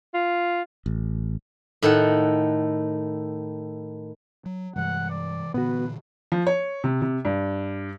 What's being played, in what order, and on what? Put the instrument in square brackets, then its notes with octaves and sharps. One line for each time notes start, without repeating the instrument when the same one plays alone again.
[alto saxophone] F4
[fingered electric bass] A1
[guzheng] A2 D#3 A4 F#5
[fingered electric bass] F#3
[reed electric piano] G2 [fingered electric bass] C3 E3 G#3 [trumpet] F#5
[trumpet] D5
[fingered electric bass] A#2 D3 E3 [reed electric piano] B3 F#4 [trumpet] B4
[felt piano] F3
C#5
C3
C3
G2